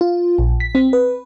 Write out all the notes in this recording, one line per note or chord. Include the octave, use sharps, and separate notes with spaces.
F4
A#1
B6
C4
B4